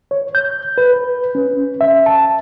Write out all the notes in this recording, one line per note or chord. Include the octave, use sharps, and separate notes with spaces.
C#5
G6
B4
C#4
E5
A5